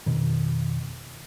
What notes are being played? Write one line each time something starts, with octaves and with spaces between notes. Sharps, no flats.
F2 B2 D#3